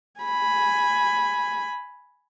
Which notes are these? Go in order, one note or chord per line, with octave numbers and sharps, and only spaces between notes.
G#5 B5